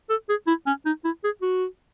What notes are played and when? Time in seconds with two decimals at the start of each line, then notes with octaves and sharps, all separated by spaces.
0.10 A4
0.29 G#4
0.47 E4
0.67 C#4
0.86 D#4
1.05 E4
1.24 G#4
1.42 F#4